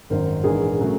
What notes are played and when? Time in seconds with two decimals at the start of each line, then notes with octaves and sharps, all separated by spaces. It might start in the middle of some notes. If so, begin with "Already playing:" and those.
0.10 G#1 F#2 D#3 A#4 C5
0.43 A#1 G#2 E3 G#4 A#4
0.79 C#3 F#3 A3